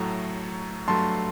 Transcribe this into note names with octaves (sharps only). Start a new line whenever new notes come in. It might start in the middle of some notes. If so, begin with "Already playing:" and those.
Already playing: A2 F#3 A3 A#5
G2 F#3 A3 A5 C6